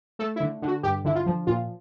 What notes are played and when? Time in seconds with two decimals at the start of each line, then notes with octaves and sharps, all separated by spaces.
0.19 A3 A4
0.36 E4
0.40 D3
0.62 D3
0.68 F#4
0.83 G2 G4
1.04 D3 E4
1.15 F4
1.26 F3
1.47 A#2 F4